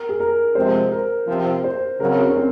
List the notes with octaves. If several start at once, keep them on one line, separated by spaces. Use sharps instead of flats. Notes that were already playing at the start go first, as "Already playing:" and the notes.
Already playing: A#4
G#4
A#4
C3 F3 G#3 C4 C5
A#4
C3 F3 C4
C5
F#2 C#3 F#3 C4 A#4
C#4
C4